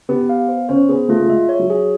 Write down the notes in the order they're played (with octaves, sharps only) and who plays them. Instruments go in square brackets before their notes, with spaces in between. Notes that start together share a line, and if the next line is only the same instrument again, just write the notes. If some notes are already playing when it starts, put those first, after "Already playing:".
[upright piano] B3 [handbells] G4
[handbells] F5
C5
[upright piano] C#4 [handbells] C5
[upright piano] B3 [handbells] G#4
[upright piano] A3 [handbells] F4
[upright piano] A3
[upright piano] G#3 [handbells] E5
[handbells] C#5
[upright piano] F#3
[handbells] G#4